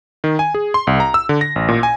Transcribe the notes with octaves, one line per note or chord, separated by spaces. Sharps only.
D#3
G#5
G#4
C6
C2
A#5
E6
D3
A#6
A1
A#2
G#5